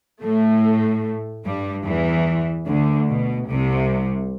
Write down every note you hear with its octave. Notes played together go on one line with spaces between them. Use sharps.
A2 A3
G2 G3
E2 E3
D2 D3
B2
C2 C3